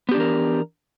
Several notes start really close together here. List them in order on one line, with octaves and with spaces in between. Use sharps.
B3 G4 D4 E3 A#4